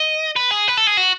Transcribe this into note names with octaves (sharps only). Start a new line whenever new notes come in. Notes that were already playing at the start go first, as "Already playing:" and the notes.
Already playing: D#5
B4
G#4
B4
A4
G#4
F#4